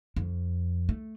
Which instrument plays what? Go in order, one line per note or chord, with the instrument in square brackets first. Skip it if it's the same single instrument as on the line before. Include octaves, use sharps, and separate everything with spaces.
[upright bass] F2
A3